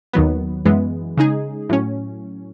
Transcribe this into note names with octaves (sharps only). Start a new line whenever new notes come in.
D#2 D#3 F#3 B3
F#2 E3 G#3 B3
C#3 G#3 D#4 G#4
A2 F#3 C#4